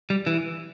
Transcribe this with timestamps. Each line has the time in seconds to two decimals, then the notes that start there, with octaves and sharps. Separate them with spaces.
0.10 G3
0.27 E3